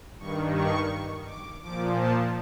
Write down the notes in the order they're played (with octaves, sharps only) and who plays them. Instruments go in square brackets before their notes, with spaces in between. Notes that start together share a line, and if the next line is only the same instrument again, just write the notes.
[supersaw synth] G2 D#3 C#6
C#6
D6
A#2 F3 D6
A5